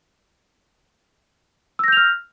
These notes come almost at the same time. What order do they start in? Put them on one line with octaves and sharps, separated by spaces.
E6 A#6 G6 F7 F6